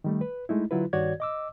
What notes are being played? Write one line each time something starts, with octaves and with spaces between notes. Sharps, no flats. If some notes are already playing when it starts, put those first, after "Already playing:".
D#3 G3 A3
B4
G#3 A3 D#4 E4
D3 F#3 E4 F4 B4
G2 D#3 F#4 C#5 D5 G#6
D#5 D6 E6